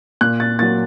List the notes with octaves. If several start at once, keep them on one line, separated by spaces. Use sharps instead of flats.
A#2 F#6
A6
F#3 A#3 A6